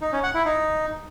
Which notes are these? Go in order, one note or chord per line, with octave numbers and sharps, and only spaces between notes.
D#4
C#4
F#5
E4
D#4